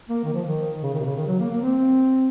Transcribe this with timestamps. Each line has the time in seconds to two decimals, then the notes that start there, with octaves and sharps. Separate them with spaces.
0.09 A#3
0.24 D#3
0.34 F3
0.45 D#3
0.83 C#3
0.94 D#3
1.00 C3
1.05 C#3
1.16 D#3
1.27 F#3
1.39 A#3
1.50 A#3
1.61 C4